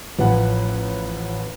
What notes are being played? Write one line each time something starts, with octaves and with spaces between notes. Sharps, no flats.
A1 F3 B4 F#5